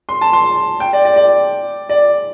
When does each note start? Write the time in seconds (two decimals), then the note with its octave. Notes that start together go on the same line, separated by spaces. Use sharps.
0.09 C6
0.21 A5
0.33 C6
0.80 G5
0.93 D5
1.05 D5
1.16 D5
1.89 D5